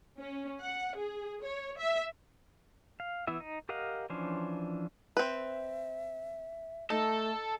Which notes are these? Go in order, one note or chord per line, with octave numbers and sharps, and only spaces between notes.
C#4
F#5
G#4
C#5
E5
F5
E3 B3 E4 E5
D#4
G4 A#4 D#5 F5 F#5
E3 F3 C#4 D4 C5
C4 B4 E5
A3 D#4 A4